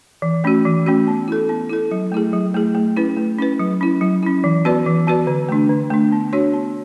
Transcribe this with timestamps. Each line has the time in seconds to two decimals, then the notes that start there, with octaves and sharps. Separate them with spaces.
0.22 E3
0.44 A3 C#4 F#4
0.65 E3
0.87 A3 C#4 F#4
1.08 B3
1.28 E4 A4
1.49 B3
1.69 E4 A4
1.91 F#3
2.12 A3 E4 G#4
2.33 F#3
2.54 A3 E4 G#4
2.75 A3
2.97 C#4 E4 B4
3.17 A3
3.39 C#4 E4 B4
3.59 F#3
3.81 C#4 E4
4.01 F#3
4.23 C#4 E4
4.44 E3
4.65 B3 F#4 B4 D5
4.86 E3
5.07 B3 F#4 B4 D5
5.27 D3
5.49 A3 D4
5.69 D3
5.90 A3 D4
6.12 B3
6.33 D4 F#4 C#5
6.54 B3